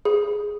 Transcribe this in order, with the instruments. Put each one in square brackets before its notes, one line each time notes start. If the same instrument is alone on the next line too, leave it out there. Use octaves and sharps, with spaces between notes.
[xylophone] G#4